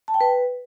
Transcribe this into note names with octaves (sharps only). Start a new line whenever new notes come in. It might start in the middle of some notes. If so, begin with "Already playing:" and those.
A5
G5
B4